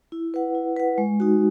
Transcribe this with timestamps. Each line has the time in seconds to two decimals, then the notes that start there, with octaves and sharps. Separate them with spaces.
0.12 E4
0.34 B4 F#5
0.55 E4
0.77 B4 F#5
0.98 G#3
1.20 D#4 F#4